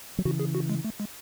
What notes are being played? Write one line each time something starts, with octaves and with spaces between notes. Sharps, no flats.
F#3
C#3 E3 F#4
G#4
F#4
G#3
A3
G#3